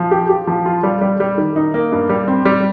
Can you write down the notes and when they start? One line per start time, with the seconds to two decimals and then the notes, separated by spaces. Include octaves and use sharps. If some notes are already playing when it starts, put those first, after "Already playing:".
Already playing: F3
0.11 G4
0.29 G4
0.47 F3
0.66 F4
0.83 G3
1.01 G3
1.20 G3
1.38 D#3
1.56 D#4
1.74 A#3
1.92 G2
2.09 G3
2.28 C4
2.45 G3